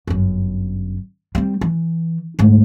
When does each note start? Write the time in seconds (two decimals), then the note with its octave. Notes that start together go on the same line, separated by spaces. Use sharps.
0.07 G1 F#2
1.35 G3 C4
1.61 E3
2.39 D2 G#2